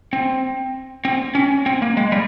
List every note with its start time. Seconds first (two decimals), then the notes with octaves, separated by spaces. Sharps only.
0.13 C4
1.05 C4
1.35 C#4
1.66 C4
1.82 A#3
1.97 G#3
2.12 G3